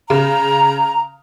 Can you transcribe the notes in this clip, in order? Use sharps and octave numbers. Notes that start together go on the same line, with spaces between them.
C#3 A#5